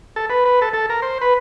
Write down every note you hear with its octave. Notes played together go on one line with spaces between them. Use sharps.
A4
B4
B4
A4
A4
A#4
C5
B4